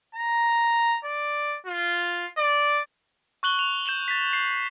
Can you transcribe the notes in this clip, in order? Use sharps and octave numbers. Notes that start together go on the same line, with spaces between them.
A#5
D5
F4
D5
C#6 F#6 F#7 G7
F7
G6 E7 F#7 G7
A6 B6
C7